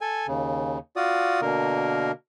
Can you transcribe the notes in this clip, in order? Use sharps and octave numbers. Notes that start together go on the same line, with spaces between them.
A4 G#5
D#2 C#3
F4 F#4 D5 D#6
B2 D3 A#3 A#4